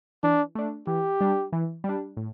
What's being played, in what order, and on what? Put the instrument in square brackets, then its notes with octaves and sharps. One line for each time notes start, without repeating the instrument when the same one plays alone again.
[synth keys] E3 [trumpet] D4
[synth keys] A3 D4
[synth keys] E3 [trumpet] G4
[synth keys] G3 D4
E3
G3
D4
A2